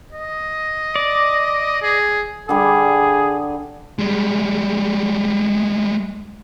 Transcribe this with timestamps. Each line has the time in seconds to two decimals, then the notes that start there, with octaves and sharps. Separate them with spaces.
0.12 D#5
0.96 D5
1.82 G#4
2.49 D3 G3 G#4
3.99 G3 G#3